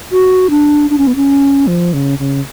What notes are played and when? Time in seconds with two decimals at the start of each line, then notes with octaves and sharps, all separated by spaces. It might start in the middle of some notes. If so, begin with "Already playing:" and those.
0.12 F#4
0.50 D4
0.90 D4
0.98 C#4
1.07 B3
1.16 C#4
1.67 F3
1.93 C#3
2.19 C#3